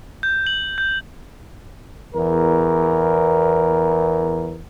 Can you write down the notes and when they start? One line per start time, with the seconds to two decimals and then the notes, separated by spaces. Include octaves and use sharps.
0.23 G6
0.47 F#7
0.78 G6
2.14 E2 A#4